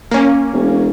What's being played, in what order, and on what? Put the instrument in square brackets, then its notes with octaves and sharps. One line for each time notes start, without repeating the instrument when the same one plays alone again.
[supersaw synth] A#3 C#4
[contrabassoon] E1